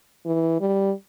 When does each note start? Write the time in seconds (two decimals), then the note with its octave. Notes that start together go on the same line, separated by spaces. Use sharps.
0.25 E3
0.60 G3